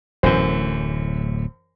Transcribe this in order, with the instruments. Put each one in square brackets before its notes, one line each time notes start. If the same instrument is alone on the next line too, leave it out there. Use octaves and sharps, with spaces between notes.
[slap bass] D1 A2 [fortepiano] F#2 E3 C5